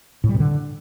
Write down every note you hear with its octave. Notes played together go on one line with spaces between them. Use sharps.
A2
G3
B2
D3